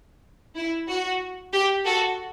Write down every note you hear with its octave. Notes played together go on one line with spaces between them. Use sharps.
E4
F#4
G4
F#4 A4